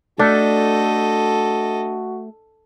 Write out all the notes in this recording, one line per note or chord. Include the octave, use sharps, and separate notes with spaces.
A3 D4 F#4 A4 D#5